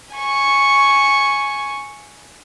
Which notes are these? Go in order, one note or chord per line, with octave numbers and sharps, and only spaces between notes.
G#5 C#6